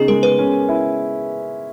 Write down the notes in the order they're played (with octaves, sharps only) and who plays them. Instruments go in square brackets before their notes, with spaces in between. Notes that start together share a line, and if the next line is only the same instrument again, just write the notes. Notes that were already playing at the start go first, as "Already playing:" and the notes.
Already playing: [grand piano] C#3 D#4 [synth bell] B3 G#4
[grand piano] G#3 [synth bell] A#4
[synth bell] B4
[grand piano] C#4
E4